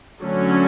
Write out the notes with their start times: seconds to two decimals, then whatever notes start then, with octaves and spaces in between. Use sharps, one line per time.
0.22 D3 F#3 A3 C#4